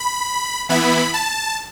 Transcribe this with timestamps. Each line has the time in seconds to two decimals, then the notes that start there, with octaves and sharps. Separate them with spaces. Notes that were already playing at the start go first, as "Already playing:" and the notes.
Already playing: B5
0.69 E3 B3 E4 B5
1.14 A5